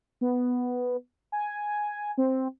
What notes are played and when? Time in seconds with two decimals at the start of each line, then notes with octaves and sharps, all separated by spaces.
0.21 B3
1.32 G#5
2.18 C4